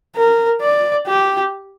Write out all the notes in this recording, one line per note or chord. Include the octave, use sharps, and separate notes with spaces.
A#4
D5
G4